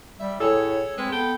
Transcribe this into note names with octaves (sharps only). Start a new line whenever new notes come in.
G3 E5
A2 G#4 A4 C#5 E6
G#3 C4 B4
B3 A4 G5